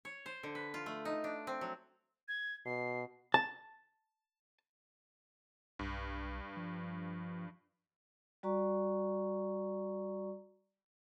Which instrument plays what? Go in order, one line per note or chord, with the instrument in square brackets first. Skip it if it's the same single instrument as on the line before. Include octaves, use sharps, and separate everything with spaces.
[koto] C#5
C5
D3
B4
F4
A3
D#4
D4
C4
F#3
[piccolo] G#6
[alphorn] B2 [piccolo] C7
[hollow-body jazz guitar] A5
[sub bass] B1 [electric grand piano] G2
[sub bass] F3
[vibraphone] G3 F#4 D5 A#5 C#6